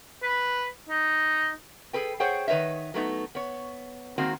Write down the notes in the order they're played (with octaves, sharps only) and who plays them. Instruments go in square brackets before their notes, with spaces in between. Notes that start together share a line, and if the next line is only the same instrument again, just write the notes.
[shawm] B4
D#4
[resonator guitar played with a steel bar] G#4 A4 B4 G5
G#4 C5 C#5 F#5 G5
D#3 B4 C#5 D#5 E5
F#3 A3 B3 D#4
B3 C#5
D#3 G#3 A#3 C4 F#4